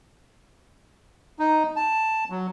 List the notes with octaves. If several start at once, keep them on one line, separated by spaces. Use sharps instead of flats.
D#4
A5
F#3